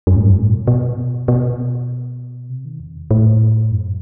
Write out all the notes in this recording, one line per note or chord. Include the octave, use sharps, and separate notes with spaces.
F#2
A2
G2
A2
B2
B2
B2
C3
D#3
E2
A2
F#2